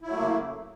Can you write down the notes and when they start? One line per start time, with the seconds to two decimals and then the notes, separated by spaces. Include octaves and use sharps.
0.02 E4
0.07 F#3
0.11 A3
0.16 A#3
0.21 C#3